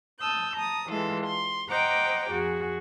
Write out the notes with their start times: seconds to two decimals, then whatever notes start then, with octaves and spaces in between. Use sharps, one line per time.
0.20 A5 D#6 E6 G6
0.56 A5 A#5 D#6
0.90 E3 G#3 F4 A4
1.26 C6
1.71 C5 D#5 F#5 G5 A#5 D6
2.31 F2 F#4 G#4